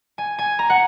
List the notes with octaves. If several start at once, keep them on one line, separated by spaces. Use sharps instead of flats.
G#5
G#5
A#5
F#5